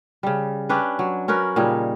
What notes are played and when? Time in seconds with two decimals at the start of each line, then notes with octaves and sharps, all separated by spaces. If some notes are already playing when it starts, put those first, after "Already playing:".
0.23 C#3 G3
0.69 C#4 D4 G4 B4
0.99 F#3
1.28 C#4 F#4 A#4 B4
1.56 A#2 C#3 G3 D#4